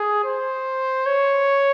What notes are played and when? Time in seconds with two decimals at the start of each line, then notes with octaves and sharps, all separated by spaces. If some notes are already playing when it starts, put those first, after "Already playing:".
Already playing: G#4
0.24 C5
1.06 C#5